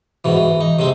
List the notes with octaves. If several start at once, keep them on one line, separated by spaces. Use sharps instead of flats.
G#2 B2 E3
E3
D#4
C3 G#3 C4